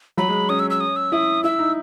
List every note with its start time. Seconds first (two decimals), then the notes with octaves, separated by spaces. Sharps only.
0.17 F#3 B5
0.29 G#3
0.49 C#4 D#6
0.60 E6
0.70 E6
0.80 D#6
0.96 E6
1.12 E4 D#6
1.44 E4 E6
1.59 D#4